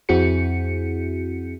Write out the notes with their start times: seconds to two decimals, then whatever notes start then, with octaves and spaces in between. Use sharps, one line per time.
0.09 F2 C4 E4 F#4 G#4 C#7